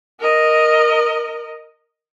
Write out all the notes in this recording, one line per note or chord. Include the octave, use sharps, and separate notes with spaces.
A#4 D#5